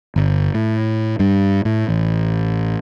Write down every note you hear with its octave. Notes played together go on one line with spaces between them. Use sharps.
G1
A2
G2
A2
A1